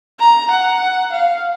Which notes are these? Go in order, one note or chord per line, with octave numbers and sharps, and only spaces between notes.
A#5
F#5
F5